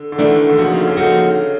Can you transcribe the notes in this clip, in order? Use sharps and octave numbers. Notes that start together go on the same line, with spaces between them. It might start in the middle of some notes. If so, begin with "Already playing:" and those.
Already playing: D3
D3
D#3 E3 A3 D4 F#4
D3
C#3 F3 A#3 D#4 F#4
C#3
D3
C#3
D3 F3 A#3 D#4 F#4